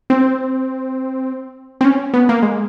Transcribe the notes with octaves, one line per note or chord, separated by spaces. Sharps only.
C4
C4
C#4
B3
A#3
G#3